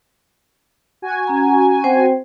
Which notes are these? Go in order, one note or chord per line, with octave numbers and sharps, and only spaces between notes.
F#4 G#5
C#4 A#5
C4 C5 G5